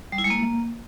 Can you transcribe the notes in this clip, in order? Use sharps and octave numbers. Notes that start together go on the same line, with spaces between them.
G3
E4
G#3
A#3